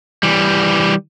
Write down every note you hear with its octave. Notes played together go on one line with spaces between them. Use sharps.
E3 G3